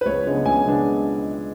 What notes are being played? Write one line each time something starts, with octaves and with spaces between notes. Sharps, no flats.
B4
C#2 C#5
C#3 G#3 B3 D4
C#2 G#5
C#3 G#3 B3 D4